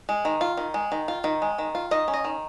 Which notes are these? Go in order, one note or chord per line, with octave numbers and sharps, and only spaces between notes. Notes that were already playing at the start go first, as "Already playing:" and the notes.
G#3
D#3
F4
D#3
G#3
D#3
F4
D#3
G#3
D#3
F4
D#3 D#5
C#4
D#5
D#3